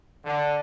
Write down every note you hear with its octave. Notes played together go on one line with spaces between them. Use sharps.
D3